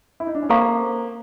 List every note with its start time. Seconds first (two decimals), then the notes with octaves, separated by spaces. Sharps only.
0.20 E4
0.27 D#4
0.35 D4
0.43 C#4
0.49 A#3 C4 A4 C5 F5 A#5 C#6